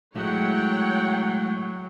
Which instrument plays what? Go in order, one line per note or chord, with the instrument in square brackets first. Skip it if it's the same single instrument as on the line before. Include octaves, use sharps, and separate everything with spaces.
[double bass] F#3 [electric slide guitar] G#3 A3 E4 [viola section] C#5 F#5 G5